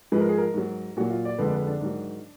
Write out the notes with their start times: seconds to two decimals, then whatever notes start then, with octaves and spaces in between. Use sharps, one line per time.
0.12 G#2 F3 G#3 B4
0.20 A#4
0.29 G#4
0.38 A#4
0.54 G#2 F#3
0.96 A#2 F#3 F#4
1.10 F4
1.25 D5
1.38 F2 D3 G#3 B4
1.47 D5
1.52 B4
1.67 D4
1.81 G#2 D#3 F#3